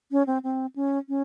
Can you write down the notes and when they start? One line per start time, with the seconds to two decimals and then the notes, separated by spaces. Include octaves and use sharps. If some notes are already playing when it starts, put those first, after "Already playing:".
0.11 C#4
0.27 C4
0.43 C4
0.76 C#4
1.09 C#4